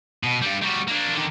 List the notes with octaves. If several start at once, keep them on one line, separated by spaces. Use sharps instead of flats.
B2
G2 G3
G3 F#4
A#3 D4
D3 D#3